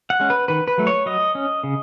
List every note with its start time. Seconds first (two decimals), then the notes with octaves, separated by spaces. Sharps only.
0.10 F#5
0.20 G#3 C#4
0.30 B4
0.48 D#3 B4
0.68 B4
0.78 F#3 A3
0.87 C#5
1.06 F#3 D#5
1.35 C#4
1.64 C#3